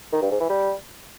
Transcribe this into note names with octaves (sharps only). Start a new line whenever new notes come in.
D#3
G2
G#2
E3
G3